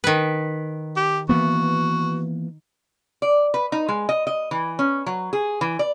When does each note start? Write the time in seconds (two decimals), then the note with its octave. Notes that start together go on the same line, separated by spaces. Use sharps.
0.04 D#3 B4
0.97 G4
1.29 E3 A#3 B3 F#4
3.22 D5
3.54 B4
3.72 D#4
3.89 G#3
4.09 D#5
4.27 D#5
4.51 E3
4.79 C#4
5.06 F#3
5.33 G#4
5.61 E3
5.79 D5